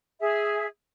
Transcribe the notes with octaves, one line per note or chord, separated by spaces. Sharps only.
G#4 E5